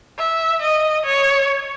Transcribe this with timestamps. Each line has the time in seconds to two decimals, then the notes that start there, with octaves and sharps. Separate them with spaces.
0.18 E5
0.62 D#5
1.06 C#5